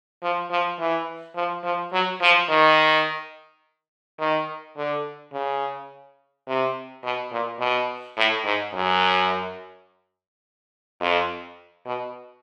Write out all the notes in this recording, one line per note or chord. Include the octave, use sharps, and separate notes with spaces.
F3
F3
E3
F3
F3
F#3
F3
D#3
D#3
D3
C#3
C3
B2
A#2
B2
A2
G#2
F#2
F2
B2